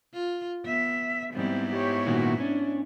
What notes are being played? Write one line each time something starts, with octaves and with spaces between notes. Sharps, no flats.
F4
B3 E5
G#2 G3 B3 C4 E4
G4 C#5
A#2 D#3 F#4
C#4 D4